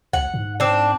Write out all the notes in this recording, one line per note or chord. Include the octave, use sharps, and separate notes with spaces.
C#2 F#5
G#2
C4 D4